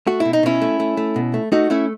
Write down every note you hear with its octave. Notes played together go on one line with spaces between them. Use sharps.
A3 F#4
E4
B2
D#4
B2 C#4 E4
A3
A3
A3
B2
A3
A3 D#4 F#4
A3 C#4 E4